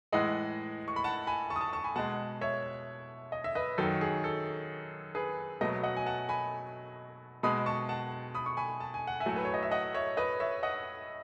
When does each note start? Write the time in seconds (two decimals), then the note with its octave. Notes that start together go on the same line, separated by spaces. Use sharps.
0.12 A2 E3 G#3 D#5 F#5
0.88 C#6
0.96 B5
1.04 F#5 A5
1.27 G#5 B5
1.50 A5 C#6
1.56 D#6
1.61 A5 C#6
1.73 A5 C#6
1.84 G#5 B5
1.96 B2 G#3 F#5 A5
2.41 C#5 E5
3.32 D#5
3.44 E5
3.55 B4 D#5
3.78 F#2 D#3 F#3 A4
4.01 G#4
4.24 A4
5.15 G#4 B4
5.61 B2 F#3 A3 B4 D#5
5.83 D#5 F#5
5.97 G#5
6.06 F#5 A5
6.29 G#5 B5
7.43 B2 G#3 B5 D#6
7.66 A5 C#6
7.89 F#5 A5
8.35 B5 D#6
8.46 C#6
8.57 G#5 B5
8.80 A5
8.94 G#5
9.07 F#5
9.20 E5 G#5
9.26 A2 F#3 A3
9.36 B4
9.45 C#5
9.54 D#5
9.63 E5
9.71 D#5 F#5
9.94 C#5 E5
10.17 B4 D#5
10.40 C#5 E5
10.63 D#5 F#5